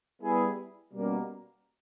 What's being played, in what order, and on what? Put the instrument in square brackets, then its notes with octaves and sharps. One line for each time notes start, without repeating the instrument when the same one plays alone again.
[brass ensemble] G3 B3 E4 G#4
B2 G3 A#3 C#4